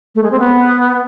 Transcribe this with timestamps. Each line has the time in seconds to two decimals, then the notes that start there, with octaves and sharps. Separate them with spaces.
0.15 A3
0.23 G#3
0.31 C4
0.39 B3